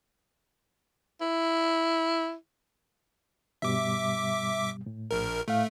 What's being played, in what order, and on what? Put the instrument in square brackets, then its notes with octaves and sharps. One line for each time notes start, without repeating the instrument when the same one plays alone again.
[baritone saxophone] E4
[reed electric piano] G2 B2 G3 [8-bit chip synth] E5 D6
[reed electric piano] A2
[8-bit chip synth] A#1 A#4
[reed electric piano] A2 F5 [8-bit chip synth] A3